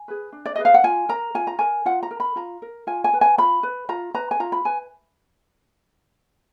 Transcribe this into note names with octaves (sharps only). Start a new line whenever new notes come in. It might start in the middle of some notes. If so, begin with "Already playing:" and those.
Already playing: G#5
G#4 B4
D4
D5
G#4 B4 D#5
F5
F#5
F4 G#5
A#4 A#5
F4 G#5
A#5
A#4 G#5
F4 F#5
A#5
A#4
B5
F4 A#5
A#4
F4 G#5
G#5
B4
G#5
F4 B5
B4
F4 A#5
B4 A#5
G#5
F4 A#5
B5
B4 G#5